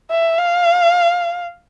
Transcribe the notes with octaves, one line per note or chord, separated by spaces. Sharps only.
E5
F5